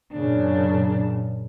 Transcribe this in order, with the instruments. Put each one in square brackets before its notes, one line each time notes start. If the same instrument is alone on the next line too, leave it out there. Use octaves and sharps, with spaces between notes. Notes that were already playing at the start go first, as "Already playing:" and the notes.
[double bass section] F#2 A#2 C#3 [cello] D4